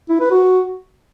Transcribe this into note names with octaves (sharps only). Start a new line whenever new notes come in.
E4
B4
F#4